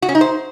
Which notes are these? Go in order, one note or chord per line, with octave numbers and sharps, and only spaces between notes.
F#4
C#4
D#4
C5